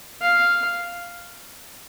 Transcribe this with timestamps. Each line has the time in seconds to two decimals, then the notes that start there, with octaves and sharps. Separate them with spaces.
0.21 F5